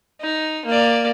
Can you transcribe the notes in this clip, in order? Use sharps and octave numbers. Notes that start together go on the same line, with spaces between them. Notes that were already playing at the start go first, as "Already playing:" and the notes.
D#4
A#3 D5